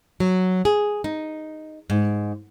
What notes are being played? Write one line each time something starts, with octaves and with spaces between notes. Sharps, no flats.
F#3
G#4
D#4
G#2